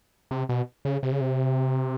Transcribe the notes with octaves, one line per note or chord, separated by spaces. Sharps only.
C3
B2
C#3
C3
C#3
C3